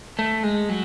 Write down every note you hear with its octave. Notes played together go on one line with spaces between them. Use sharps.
A3
G#3
F#3